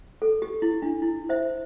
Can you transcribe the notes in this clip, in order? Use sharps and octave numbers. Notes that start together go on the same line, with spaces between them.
A4
G4
E4
D4
E4
C5 E5